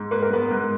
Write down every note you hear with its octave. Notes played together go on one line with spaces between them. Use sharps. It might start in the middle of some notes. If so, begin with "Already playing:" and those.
Already playing: G#2
A#3 B4
A#4
G#2 B3 B4
G#2